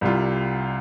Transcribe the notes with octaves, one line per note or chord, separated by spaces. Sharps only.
C2 C3 G3 F4